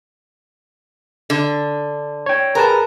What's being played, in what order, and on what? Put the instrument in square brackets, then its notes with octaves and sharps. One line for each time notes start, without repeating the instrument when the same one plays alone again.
[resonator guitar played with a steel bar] D3
[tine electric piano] C#5 G5
[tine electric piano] G#4 B4 A5 [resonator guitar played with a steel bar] A#4